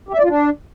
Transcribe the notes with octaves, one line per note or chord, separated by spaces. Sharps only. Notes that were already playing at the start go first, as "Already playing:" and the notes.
G4
E5
D5
F4
D4